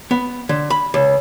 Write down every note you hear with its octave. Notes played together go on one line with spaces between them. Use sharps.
B3
D3
B5
C#2